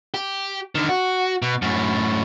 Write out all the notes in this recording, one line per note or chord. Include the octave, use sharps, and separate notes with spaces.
G4
D3 D#3
F#4
B2
F#2 A2